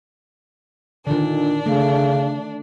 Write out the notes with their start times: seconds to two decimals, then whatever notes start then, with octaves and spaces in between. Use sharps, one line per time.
1.07 A#2 D3 D#3 D4
1.66 C#3 A3